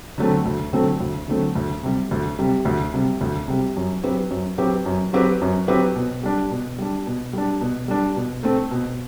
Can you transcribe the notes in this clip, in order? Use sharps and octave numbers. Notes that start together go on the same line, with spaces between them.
D3 F#3 A3 C4
D2
D3 F#3 A3 C4
D2
D3 F#3 A3 C4
D2
C3 G3
D2
C3 G3
D2
C3 G3
D2
C3 G3
F#2
F#3 C4 G4 B4
F#2
F#3 C4 G4 B4
F#2
F#3 C4 G4 B4
F#2
F#3 C4 G4 B4
B2
G3 D4
B2
G3 D4
B2
G3 D4
B2
G3 D4
B2
A3 C4
B2